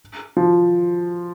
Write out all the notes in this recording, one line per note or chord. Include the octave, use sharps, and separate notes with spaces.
F3